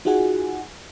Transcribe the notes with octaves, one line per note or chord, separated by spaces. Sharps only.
D#4 F4 F#4 G#4 F#5 G#5